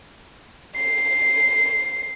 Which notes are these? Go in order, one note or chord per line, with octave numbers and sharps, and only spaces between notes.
C7